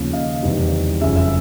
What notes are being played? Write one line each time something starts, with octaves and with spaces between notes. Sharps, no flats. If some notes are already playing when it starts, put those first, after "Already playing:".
Already playing: D#2 C#3 F3
D#5 F5
E2 C3 D#3 G3
F#1 F2 C#3 E5
E5